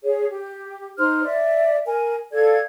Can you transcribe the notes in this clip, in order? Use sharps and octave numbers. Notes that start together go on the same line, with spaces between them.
G#4 C#5
G4
D#4 C5 C6 F6
D5 E5
A#4 G#5
A4 D5 F5 G#6